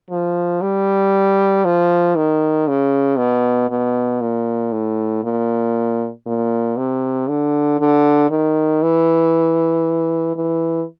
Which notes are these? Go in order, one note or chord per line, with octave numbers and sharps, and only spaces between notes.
F3
G3
F3
D#3
C#3
B2
B2
A#2
A2
A#2
A#2
C3
D3
D3
D#3
E3
E3